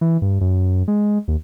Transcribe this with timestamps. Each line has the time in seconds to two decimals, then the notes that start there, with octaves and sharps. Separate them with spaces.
0.01 E3
0.22 G2
0.41 F#2
0.88 G#3
1.28 D#2